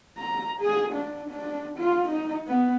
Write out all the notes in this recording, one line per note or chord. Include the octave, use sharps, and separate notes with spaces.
A#5
G#4
D4
D4
F4
D#4
B3